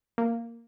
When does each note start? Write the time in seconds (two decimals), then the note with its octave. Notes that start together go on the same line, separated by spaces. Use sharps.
0.18 A#3